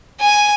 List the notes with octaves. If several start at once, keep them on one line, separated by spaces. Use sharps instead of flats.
G#5